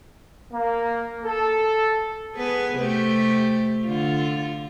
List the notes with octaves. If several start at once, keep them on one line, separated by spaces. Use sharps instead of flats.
A#3
A4
B3 G#4 B4
C3 A3 G4
D3 F4